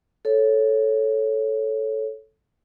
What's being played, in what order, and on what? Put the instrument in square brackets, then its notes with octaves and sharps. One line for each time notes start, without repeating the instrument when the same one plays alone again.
[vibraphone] A4 C#5